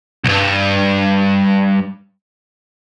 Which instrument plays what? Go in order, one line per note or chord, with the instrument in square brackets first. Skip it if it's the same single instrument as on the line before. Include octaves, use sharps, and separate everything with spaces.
[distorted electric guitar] C2 G2